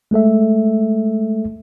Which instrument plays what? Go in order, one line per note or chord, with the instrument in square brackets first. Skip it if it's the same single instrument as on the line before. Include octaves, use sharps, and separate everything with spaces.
[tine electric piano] G#3 A3 A4 E5